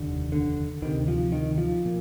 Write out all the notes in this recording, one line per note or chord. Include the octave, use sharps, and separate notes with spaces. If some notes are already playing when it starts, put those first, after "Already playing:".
Already playing: F1 D#2 D3
D3
D2 C3 D#3
F3
D#3
F3
A#2